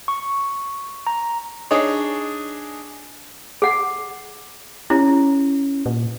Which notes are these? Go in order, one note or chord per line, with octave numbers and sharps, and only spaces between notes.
C#6
A#5
D4 D#4 G#4 C#5
G#4 F#5
C#4 E4
A#2